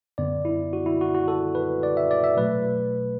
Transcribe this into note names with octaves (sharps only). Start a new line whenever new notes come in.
F#2 D3 B3 D5
E4
F#4
E4
F#4
F#4
A4
B4
D5
E5
D5
E5
B2 F#3 A3 B4